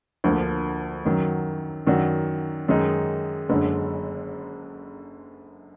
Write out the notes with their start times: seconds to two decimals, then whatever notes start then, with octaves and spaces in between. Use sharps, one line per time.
0.24 D2 D3 F3 A#3
1.05 F#2 D#3 F#3
1.87 F#2 D#3 F#3 D4 F#4
2.68 F#2 D#3 G#3 D#4
3.49 F#1 F#2 D3 G#3